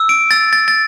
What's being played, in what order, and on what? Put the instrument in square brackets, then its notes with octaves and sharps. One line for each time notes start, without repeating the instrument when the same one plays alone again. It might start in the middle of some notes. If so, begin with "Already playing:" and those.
Already playing: [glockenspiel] E6
D7
E6 A6
A6
A6